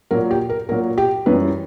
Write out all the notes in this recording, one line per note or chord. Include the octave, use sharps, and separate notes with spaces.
A#2 F#3 A#4
G4
A#4
A#2 F#3 A#4
G4
F#2 E3 G3 B4